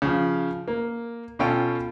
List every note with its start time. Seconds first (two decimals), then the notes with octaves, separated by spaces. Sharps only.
0.02 C#3 F3
0.68 A#3
1.39 B2 C#4 F4 A4 G5